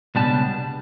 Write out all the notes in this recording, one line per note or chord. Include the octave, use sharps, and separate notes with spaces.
C#2 B2 G3 D4 A5